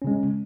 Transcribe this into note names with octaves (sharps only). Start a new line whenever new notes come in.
C#3 G#3 C#4